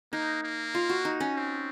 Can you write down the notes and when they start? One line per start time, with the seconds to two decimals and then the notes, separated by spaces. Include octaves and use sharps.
0.12 A#3 D#4
0.43 A#3
0.75 F4
0.90 F#4
1.05 D#4
1.20 C#4
1.36 C4